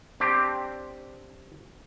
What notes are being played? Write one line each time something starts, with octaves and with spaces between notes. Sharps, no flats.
C4 D4 G4